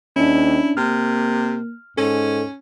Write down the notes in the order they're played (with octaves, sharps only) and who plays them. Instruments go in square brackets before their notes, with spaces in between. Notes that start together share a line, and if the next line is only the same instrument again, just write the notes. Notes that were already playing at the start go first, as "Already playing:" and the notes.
[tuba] D#2 [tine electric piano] C#4 D4 [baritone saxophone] E4
[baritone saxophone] C3 [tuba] A#3 [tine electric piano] F6
[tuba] G#2 [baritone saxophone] C#4 [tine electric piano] A4